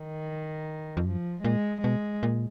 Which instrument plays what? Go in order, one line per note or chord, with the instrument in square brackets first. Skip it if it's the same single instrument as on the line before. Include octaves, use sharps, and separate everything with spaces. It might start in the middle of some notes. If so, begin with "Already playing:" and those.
Already playing: [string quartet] D#3
[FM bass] F2
[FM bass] F#2 [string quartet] F3
[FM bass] A#2 [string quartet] G#3
[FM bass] B2 [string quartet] G#3
[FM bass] A#2